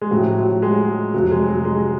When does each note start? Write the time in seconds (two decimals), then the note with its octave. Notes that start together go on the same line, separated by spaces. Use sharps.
0.02 G#3
0.11 A1 A2 F3 F#3
0.37 F#3
0.62 G#3
1.14 F1 F2 F3 F#3
1.31 G#3
1.47 F#3
1.65 G#3